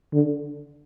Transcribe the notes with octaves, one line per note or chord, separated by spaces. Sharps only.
D3